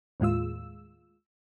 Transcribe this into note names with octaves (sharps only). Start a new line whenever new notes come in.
D#2 A2 G#3 F4 E6